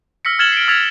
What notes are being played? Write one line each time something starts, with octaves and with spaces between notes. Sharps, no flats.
E6 F6 A#6 B6 C#7
F6 G#6 A6 E7 F#7 G7
C7 D7
E6 G#6 A6 B6 F7